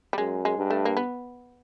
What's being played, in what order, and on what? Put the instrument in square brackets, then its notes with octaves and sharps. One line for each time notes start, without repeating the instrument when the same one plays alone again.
[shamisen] G3
[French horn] F#2 [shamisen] G#3
[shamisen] G#3
[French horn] G2
[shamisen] A3
A#3
B3